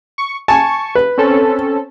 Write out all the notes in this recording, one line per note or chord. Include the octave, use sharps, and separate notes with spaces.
C#6
G#5 A5 C#6
B4
C4 C#4 A4